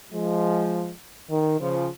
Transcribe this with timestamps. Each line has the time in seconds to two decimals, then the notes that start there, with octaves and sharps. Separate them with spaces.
0.13 F3 G#3
1.30 D#3
1.60 C#3 F3